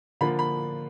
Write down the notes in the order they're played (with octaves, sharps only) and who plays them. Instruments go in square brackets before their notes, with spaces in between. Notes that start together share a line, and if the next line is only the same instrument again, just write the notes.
[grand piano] D3 F3 A#3 B5
B5